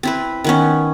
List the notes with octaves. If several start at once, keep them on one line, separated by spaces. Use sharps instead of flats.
C4 E4 B4
D#3 B3 C#4